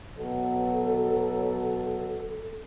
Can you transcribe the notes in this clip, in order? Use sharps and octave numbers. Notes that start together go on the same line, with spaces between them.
B2 F#3 A4